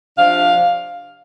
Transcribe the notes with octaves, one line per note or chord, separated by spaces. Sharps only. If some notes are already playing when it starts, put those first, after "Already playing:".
C3 F3 D4 F5